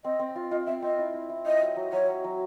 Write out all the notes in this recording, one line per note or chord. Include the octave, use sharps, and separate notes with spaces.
C4 D#5
C4
F4
F4 D#5
C4 E5
C4 D#5
E4
E4
E4
E4 D#5
F#3
F#3
F#3 C#5
F#3
F#3